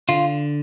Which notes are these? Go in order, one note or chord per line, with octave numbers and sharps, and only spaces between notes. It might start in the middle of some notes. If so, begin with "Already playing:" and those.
D3 F4